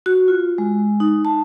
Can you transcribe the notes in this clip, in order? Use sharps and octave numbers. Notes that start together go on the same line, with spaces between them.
F#4
F4
G#3
D#4
A5